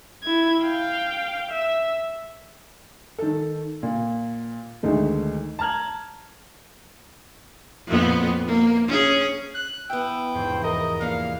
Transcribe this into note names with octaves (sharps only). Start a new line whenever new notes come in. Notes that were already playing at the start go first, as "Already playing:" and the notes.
E4 G#6
F5 G5
E5
D#3 A4
A#2
D2 D#3 G#3 A3
A5 A#5 F6 G#6 F#7
F2 A#2 B3
A#3
C#4 G#4
F#6
E3 B3 G5 E6
F1 E2 G#2 C5
A#4 D#5
A#3 D4 B4 F5 F#5